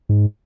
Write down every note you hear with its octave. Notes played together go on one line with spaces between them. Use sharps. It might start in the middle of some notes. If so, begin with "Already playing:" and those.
G#2